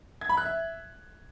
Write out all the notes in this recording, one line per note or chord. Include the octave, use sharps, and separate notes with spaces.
G#6
B5
F#6
E5